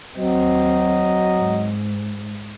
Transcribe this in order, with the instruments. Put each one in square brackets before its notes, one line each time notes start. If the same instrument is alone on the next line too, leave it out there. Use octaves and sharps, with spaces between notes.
[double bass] D#2 C4 [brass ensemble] F#3 D#5
[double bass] G#2